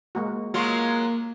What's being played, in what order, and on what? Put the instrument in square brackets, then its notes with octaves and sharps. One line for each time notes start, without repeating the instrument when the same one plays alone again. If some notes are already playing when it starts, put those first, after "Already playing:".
[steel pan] G#3 A#3 F#4
[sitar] F#3 G#3 F4 [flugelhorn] A#3 [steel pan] F#4